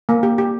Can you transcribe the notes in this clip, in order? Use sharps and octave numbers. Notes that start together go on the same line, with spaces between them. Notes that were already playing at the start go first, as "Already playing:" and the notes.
A#3
G4
G4